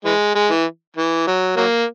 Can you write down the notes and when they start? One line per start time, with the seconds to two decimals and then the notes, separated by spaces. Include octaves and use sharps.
0.05 E3 G#3
0.35 G#3
0.50 E3
0.97 E3
1.27 F#3
1.57 F#3 A#3